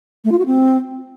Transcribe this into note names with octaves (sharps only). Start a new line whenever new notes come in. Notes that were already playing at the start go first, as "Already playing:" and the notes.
A3
F4
F#4
C4